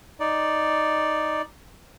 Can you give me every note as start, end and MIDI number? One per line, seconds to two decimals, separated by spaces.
0.20 1.42 63
0.20 1.42 74